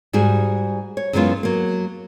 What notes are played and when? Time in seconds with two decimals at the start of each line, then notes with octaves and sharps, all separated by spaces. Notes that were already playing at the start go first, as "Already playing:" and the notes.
0.13 G#2 G3 F#4 G#4
0.97 C#5
1.13 F#2 E3 G#3 B3 C#4 F4
1.43 F#3 A#3